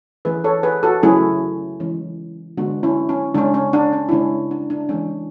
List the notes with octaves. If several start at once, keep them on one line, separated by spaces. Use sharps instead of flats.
E3 A3 C#4 G#4 B4
A4 C#5
G#4 B4
F#4 A4
C#3 F#3 A3 C#4 E4 G#4
E3 G#3 C#4
D3 G#3 B3 D4 F#4
C#4 E4
C#4
C#3 G#3 C#4 D4
C#4
D4
C#4
E4
C#3 G#3 C#4 D4
D4
D4
E3 G#3 C#4 D4